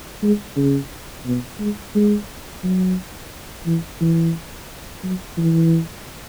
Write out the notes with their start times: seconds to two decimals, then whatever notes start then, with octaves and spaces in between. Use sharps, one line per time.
0.23 G#3
0.57 C#3
1.26 B2
1.60 G#3
1.95 G#3
2.63 F#3
3.66 E3
4.01 E3
5.03 F#3
5.38 E3